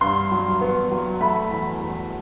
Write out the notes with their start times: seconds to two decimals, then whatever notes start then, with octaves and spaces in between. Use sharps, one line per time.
0.01 G2 C6
0.31 F#3
0.61 B3
0.91 F#3
1.21 A3 B5
1.51 E2
1.80 E2